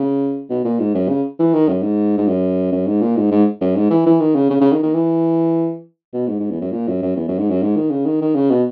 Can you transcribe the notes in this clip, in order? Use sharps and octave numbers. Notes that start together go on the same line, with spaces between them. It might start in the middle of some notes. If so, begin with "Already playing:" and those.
Already playing: C#3
B2
A#2
G#2
F#2
C#3
E3
D#3
F#2
G#2
G#2
F#2
F#2
G#2
A#2
G#2
G#2
F#2
G#2
E3
E3
D#3
C#3
C#3
C#3
D#3
D#3
E3
B2
G#2
G#2
E2
F#2
A#2
F#2
F#2
E2
F#2
G#2
F#2
G#2
D#3
C#3
D#3
D#3
C#3
B2